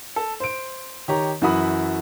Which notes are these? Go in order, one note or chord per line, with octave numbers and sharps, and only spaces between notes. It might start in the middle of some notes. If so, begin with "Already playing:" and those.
A4
C5 D7
D#3 G4 C#5 A#5
F#2 E3 E4 F#4 B5 D#6